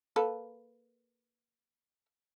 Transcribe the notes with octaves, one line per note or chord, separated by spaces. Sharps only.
A#3 A4 B4